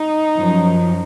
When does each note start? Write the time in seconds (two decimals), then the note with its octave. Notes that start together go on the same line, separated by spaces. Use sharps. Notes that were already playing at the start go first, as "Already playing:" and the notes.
Already playing: D#4
0.36 F#2 F3